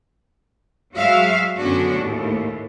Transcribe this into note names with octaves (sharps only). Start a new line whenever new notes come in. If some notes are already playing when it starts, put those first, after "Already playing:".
F#3 G#3 F#4 E5 F5
F#2 D3 B3 C#4 D4 F#4
D#2 A2